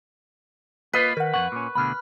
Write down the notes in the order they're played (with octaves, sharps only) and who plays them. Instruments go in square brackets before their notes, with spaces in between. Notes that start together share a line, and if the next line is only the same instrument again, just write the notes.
[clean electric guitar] A#3 F4 D#5 [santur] B4
[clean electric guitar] D#3 [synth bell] A#4 F#5
[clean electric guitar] F2 B2 F#5 [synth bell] C#6
[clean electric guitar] A#2 C#4
[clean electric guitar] D2 B2 D3 [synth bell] B5 F6